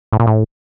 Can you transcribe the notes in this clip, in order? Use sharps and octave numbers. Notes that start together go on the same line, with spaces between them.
A2
A#2
A2